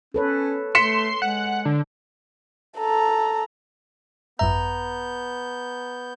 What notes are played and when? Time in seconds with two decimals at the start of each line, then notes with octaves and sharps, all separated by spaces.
0.14 C#4 A4 B4 C#5
0.75 A3 C6 B6 C#7 E7
1.22 G#3 F#5
1.66 D3
2.78 A4 A#5
4.39 G#1 F#2 B3 E5 A#5 G6